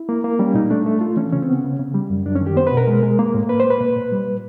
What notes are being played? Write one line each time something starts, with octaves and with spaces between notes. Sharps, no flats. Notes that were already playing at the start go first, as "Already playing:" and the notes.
Already playing: E4
A#3
A#3
G3 C#4
A#2 D#4
A3 D4
A3
A3 F4
E3 C#4
C#3 C#4
C4
B3 C#4
C#3
C#3
G3
F#2
F#2 D4
C#4
D#3
G4
B3 C5
B4
B2
A#4
G#3
G#3
A#3
A2
A#3 B4
A#3 C5
B4
A#2
A#2
G3
A#2